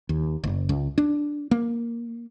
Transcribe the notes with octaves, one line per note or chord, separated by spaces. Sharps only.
D#2
F#1
C#2
D4
A#3